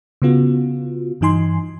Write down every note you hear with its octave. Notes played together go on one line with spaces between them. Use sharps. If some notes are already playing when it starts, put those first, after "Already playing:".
C#3 B3 F4 F#4
G2 E3 D#4 G#5 C6